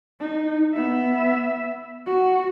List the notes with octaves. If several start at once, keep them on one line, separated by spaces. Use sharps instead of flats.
D#4
B3 E5
F#4